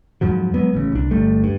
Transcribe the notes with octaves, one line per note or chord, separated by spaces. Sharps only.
F2 G#2 F3 F#3
F#3 G#3 B3
A1 C#3
C2 D4
G1 G3 A3
G2